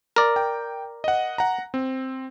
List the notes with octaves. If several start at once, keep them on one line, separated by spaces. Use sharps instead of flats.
A#4 D5
G5
D#5 F#5
F#5 A#5
C4